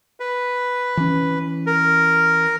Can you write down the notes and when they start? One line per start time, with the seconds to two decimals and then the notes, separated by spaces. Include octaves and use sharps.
0.20 B4
0.97 E3 C#4
1.66 A#4